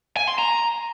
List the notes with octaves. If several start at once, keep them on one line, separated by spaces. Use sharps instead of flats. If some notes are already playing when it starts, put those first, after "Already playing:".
G#5
C6
A#5